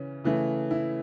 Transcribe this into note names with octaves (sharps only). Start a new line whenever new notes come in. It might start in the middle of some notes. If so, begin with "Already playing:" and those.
Already playing: C#3 E3 C#4
C#3 E3 A3
E4